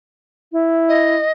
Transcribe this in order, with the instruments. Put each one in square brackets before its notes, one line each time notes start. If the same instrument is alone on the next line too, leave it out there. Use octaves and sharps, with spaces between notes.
[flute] E4
[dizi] D#5